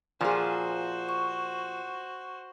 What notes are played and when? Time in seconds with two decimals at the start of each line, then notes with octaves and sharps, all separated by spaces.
0.21 A#2 F3 F#4 G#4 C5
1.09 C#6